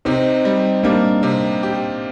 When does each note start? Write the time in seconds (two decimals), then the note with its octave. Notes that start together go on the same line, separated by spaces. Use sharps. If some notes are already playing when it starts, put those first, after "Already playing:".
0.05 C3 C4 D#4
0.45 G3
0.83 G3 A#3 D4
1.23 C3
1.63 G4